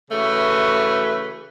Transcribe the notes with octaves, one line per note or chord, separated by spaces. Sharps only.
C#3 E3 A3 F#4 B4